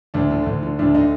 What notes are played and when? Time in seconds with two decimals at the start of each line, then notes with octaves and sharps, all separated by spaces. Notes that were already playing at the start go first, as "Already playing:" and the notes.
0.14 D2 D4
0.30 D3
0.46 D2
0.63 D3
0.79 D2 D4
0.95 D3 D#4